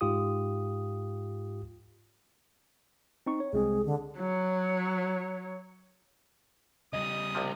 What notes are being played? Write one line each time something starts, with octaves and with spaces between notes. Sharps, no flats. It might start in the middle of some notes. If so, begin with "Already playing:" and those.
G#2 F4 G4 D#6
C4 D#4 C#6
C#5
C2 G#3 C4 G#4
D3
F#3 C#5
C#3 G3 D#5 D#6
C2 C3 F3